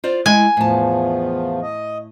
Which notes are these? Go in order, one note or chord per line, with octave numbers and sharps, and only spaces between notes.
F4 C5 D5
G#3 E4 G#5
E2 A2 F3 A5
D#5